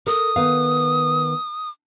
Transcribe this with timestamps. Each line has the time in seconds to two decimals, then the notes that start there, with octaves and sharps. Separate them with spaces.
0.07 A4 A#4 D#6
0.36 D#3 B3 F5